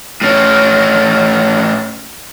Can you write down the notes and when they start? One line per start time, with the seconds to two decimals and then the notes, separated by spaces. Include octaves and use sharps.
0.22 A2 C#4